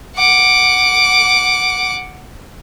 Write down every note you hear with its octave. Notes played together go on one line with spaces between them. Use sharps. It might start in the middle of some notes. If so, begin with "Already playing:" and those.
F#5 D6